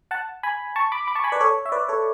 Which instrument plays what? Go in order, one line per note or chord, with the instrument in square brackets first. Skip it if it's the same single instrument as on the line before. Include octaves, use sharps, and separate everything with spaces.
[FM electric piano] F#5 A5
G#5 B5
A5 C#6
B5 D6
B5 D6
A5 C#6
G#5 B5
B4 D5
A4 C#5
E5
B4 D5
A4 C#5